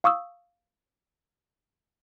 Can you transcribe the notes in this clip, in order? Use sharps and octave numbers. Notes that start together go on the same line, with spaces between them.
F5 C#6 D#6 E6